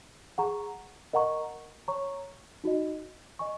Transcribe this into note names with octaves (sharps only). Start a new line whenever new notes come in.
G#4 F#5 A#5 C#6
A#4 D#5 F#5 A#5 C#6
C#5 A#5 C#6
D#4 F#4 D#5
D#5 G#5 C#6